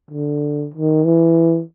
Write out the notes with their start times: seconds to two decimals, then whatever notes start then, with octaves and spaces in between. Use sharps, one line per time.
0.10 D3
0.74 D#3
1.04 E3